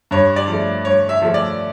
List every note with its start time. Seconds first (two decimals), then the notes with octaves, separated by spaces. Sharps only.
0.11 G2 C#5
0.36 D5
0.48 F3 A3
0.85 G2 C#5
1.09 E5
1.22 F3 A3
1.34 D5